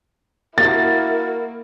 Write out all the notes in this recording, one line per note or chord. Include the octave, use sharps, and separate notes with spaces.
A#3 E4 F#4 A#4 A6